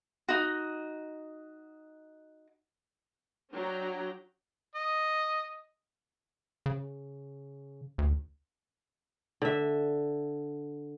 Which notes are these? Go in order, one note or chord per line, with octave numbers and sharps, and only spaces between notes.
D#4 F#4
F#3 D4 G5 A#5
D#5
C#3
D2
D3 E5